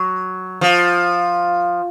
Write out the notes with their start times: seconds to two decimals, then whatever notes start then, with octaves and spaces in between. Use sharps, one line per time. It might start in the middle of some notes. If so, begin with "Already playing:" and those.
Already playing: F#3
0.61 F3